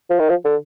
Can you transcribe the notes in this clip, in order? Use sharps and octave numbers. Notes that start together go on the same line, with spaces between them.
F3
D#3
F3
D3